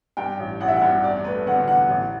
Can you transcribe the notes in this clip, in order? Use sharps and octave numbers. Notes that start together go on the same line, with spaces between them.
G2 G5
A1
A1 F#5
E5
F#5
G2
E2 D5
A3 B4
D3 F#5
E2 F#5
A1